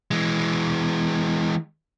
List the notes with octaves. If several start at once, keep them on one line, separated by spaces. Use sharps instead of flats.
E3 G#3